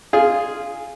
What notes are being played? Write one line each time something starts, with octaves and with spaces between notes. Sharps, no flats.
F4 G#4